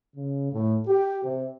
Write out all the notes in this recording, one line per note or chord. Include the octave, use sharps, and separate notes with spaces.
C#3
A2
G4
C3